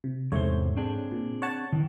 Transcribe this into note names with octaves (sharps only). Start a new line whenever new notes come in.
C3
E2 G#2 C3 A3 C5 C#5
C4 D4 G#4
A#2
C#5 F#5 A5
D#3 E3